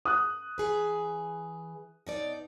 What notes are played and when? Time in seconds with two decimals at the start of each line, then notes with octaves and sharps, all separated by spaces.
0.05 D#6 F#6
0.58 E3 G#4 B4
2.07 B2 D#4 D5